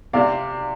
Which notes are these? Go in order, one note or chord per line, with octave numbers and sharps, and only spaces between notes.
C3 D5 F5